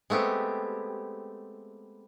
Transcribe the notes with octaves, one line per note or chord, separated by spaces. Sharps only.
G#3 A3 B3 C4 G4